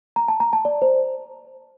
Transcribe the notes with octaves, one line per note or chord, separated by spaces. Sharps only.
A#5
A5
A#5
A5
D5
C5